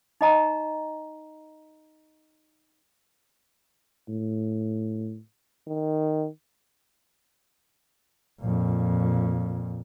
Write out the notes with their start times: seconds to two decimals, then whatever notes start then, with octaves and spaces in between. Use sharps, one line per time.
0.21 D#4 D#5 A#5
4.09 A2
5.68 D#3
8.40 F2 A#2